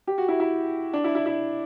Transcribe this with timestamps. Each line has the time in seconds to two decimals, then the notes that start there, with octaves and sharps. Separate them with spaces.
0.07 G4
0.18 F#4
0.28 E4
0.40 E4
0.93 D4
1.04 E4
1.15 E4
1.26 E4